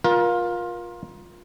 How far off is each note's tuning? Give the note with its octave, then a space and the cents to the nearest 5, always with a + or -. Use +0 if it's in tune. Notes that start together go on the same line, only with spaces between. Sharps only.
F4 +15 A#4 +30